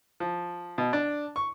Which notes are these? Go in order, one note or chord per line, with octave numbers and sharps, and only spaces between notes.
F3
B2
D4
C#6